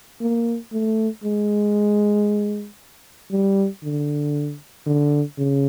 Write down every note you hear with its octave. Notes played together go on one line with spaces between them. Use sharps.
A#3
A3
G#3
G3
D3
D3
C#3